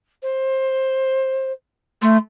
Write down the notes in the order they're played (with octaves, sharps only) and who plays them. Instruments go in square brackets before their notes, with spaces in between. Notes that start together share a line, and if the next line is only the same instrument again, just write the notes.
[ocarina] C5
[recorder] A3 [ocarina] C6